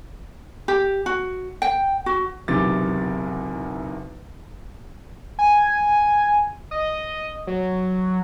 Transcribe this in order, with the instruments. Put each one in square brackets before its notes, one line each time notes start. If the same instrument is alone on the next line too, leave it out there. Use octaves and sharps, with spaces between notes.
[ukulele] G4
F#4
G5
F#4
[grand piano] F#1 B1 E2 C3 D6 A6
[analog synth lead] G#5
D#5
F#3